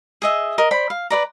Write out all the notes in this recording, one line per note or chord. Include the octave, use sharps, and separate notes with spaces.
G#4 D#5 E5
A#4 D#5
C5 D5 B5
F5
B4 D5 A#5